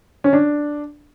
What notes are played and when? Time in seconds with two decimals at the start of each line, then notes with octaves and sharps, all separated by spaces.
0.24 C#4
0.33 D4